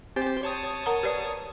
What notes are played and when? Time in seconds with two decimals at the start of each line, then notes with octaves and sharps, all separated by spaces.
0.16 C4 G4 C5
0.43 C#5 A5 D#6
0.86 A#4 F#5 A#5
1.03 G4 B4 D5